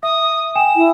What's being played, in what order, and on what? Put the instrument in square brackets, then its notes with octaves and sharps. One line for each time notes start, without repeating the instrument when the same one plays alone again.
[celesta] E5 [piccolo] D#6
[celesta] G5 G#5 [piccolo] E7
[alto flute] E4